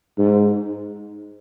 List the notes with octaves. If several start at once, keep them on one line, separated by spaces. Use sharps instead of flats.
G#2